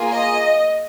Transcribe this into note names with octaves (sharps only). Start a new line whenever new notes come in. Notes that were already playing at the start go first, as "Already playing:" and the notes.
Already playing: A#3 F4 G#4
D#5